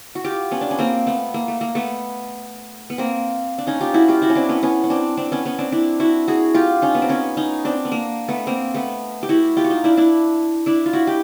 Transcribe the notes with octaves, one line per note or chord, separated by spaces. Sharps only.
F#4
F4 G4
B3 C#4
D4
C#4
A#3 C4
A3 B3
A#3
A3
A#3
A3 B3
B3
A#3 C4
D4
C#4 D#4
F4 G4
E4 F#4
F4 G4
E4 F#4
C#4
C4 D4
B3 C#4
B3 C#4
C#4
C4 D4
C4 D4
B3 C#4
B3 C#4
C4 D4
D4 E4
E4 F#4
F#4 G#4
F4 G4
C#4 D#4
B3
C4
B3 C#4
C#4 D#4
C4 D4
B3
A#3
A3 B3
A#3 C4
A3 B3
G4
E4 F#4
F4 G4
F#4
D#4 F4
D4 E4
D4 E4
D4 E4
F4
E4 F#4
G4